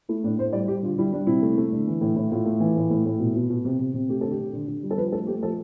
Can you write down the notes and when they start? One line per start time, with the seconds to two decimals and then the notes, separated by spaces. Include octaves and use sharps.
0.09 A3 E4
0.24 A2 D4
0.38 A2 C5
0.53 G3 D5
0.68 G3 G4
0.83 D3 F4
0.98 G3 E4
1.12 G3 D4
1.27 C3 E4
1.42 A3
1.57 A3
1.72 D3
1.87 E3
2.01 A2
2.16 A2
2.31 A2 F4
2.46 A3
2.60 E3
2.76 A2
2.90 A2
3.05 A2
3.20 B2
3.36 B2
3.50 B2
3.65 C3
3.79 C3
3.94 C3
4.09 A3 G4
4.21 D3 A4
4.32 G4
4.38 D3
4.53 D3
4.68 D3
4.83 G3
4.91 A4
4.98 F3 B4
5.12 A3 A4
5.27 A3 G4
5.43 F3 A4